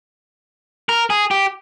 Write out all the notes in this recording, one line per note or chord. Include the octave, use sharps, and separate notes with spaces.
A#4
G#4
G4